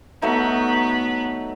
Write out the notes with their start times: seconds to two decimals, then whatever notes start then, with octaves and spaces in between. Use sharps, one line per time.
0.22 F#3 A3 B3 D#4 B4